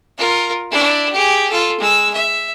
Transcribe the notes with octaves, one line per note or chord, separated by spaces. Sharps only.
F4 A#4
D4 E4
G4 G#4
F4 A4
G#3 E6
E5